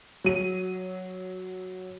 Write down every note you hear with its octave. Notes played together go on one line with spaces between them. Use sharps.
F#3 D#7